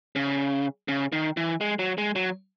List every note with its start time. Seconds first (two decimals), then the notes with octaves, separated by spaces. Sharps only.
0.16 C#3
0.88 C#3
1.12 D#3
1.37 E3
1.61 G#3
1.79 F#3
1.98 G#3
2.16 F#3